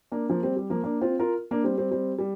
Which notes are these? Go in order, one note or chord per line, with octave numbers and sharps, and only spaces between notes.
A#3 D4
F3 A#3
G3 C4
G3
F3 A#3
A#3 D4
C4 F4
F4 A#4
A#3 D4
G3 C4
G3 C4
G3 C4
G3